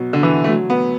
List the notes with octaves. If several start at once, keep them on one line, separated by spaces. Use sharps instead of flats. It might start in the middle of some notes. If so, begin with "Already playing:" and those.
Already playing: B2 F#3
D3
E3
A3
F#3
B3